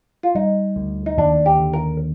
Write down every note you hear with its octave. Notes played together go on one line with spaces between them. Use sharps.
F4
G3 D#4
D2
D#4
D#2 D4
G4
D3
A#4